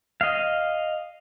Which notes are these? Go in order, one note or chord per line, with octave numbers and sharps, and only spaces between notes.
D#5 F5